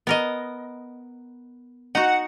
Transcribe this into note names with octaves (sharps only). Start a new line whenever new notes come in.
B3 A#4 D#5
D#4 F#4 F#5